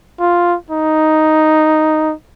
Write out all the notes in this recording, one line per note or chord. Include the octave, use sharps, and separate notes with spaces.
F4
D#4